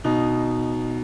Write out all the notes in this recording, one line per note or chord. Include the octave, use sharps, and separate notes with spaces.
B2 D#4